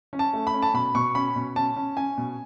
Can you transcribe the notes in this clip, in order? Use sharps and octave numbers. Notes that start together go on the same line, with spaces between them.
C#4
A5
A3
B5
C#4
A5
B2 B5
B2 C#6
C#4 B5
B2
C#4 A5
C#4
C#4 G#5
B2